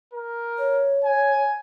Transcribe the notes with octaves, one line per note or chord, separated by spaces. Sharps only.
A#4
C#5
G#5